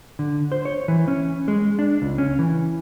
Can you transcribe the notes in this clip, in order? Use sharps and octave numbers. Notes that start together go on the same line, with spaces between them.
D3
C5
C#5
E3
C#4
G#3
D4
C#2
C#4
E3